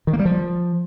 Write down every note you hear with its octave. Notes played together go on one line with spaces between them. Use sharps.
D#3
A#3
G3
F3